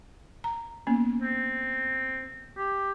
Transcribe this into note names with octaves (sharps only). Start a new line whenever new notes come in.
A#5
A#3 B3 C#4
C4
G4